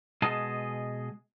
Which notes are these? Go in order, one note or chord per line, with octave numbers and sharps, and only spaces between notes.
B2 G#3 G#4 D#5 A5